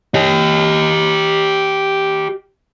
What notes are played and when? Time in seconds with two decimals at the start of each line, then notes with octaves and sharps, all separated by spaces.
0.14 G4 D#5